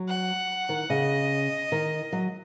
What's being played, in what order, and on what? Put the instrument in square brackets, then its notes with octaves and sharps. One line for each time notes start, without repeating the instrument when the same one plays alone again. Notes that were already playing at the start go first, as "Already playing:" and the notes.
Already playing: [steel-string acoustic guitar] F#3
[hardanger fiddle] F#5
[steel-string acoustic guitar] D#3
[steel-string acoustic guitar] C#3 [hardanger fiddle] D#5
[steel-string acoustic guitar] D#3
F#3